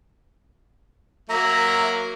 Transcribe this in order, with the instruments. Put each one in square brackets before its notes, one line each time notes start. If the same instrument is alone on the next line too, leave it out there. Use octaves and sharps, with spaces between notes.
[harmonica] F#3 A#3 [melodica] E5 A#5